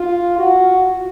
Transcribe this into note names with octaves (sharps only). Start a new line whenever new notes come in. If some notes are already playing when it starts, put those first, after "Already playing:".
Already playing: F4
F#4